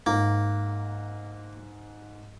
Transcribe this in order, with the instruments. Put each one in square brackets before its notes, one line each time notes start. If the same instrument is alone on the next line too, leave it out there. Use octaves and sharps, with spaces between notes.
[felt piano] G#2 [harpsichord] A#3